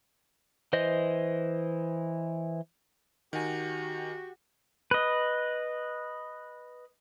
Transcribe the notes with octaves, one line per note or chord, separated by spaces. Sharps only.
E3 C5 D#5
D#3 F#4 G4 G#5
B4 D#5